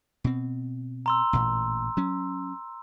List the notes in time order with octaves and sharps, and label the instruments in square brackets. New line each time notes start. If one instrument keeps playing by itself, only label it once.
[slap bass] B2 C4
[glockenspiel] A#5 C6 E6
[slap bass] A1 A#2
F#3 C#4